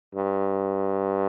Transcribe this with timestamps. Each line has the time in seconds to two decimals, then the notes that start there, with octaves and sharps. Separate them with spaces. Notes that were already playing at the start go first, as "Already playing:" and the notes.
0.15 G2